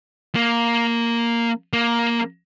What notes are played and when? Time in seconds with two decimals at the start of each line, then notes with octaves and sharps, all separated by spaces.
0.35 A#3
1.73 A#3